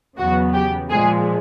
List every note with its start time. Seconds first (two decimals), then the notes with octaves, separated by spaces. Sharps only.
0.17 E2 C#3 F#3 B3 F#4
0.54 G4
0.90 A#2 F3 G#3 G#4